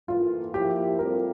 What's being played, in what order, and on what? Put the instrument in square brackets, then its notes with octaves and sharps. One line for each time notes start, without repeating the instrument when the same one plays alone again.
[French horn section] A2 E3 A#3 [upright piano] F4
[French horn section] F3 A#3 E4 [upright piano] G4
[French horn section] A2 G3 C4 F4 [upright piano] A#4